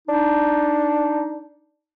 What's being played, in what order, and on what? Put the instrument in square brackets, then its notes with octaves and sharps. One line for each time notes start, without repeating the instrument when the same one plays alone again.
[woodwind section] D4 D#4